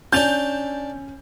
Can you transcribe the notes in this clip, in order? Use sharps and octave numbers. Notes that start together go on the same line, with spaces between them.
C#4 D4 G#5 A5 G6 F7